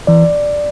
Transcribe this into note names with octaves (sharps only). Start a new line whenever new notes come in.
E3 D5